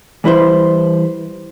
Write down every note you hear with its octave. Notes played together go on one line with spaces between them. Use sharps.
E3 G3 E4 B4 C5